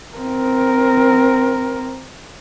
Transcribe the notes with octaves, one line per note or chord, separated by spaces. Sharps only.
C4 A#4